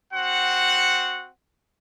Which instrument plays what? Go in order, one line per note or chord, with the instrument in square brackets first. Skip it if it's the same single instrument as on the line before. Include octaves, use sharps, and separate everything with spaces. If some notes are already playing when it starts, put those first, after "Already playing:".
[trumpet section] C4 F#4 F#5